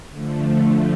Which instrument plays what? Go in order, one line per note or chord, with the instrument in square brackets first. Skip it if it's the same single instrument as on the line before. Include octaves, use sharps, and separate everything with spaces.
[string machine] D3 F3 A3